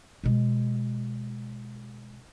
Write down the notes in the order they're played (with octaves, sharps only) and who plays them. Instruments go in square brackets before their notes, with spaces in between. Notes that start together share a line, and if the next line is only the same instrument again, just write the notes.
[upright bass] B2 G#3